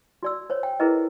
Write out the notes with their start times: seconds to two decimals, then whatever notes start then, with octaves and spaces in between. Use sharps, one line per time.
0.23 F#4 D5 E6
0.50 C5 C#5
0.63 G5
0.80 E4 G#4 A#4 B4 D#5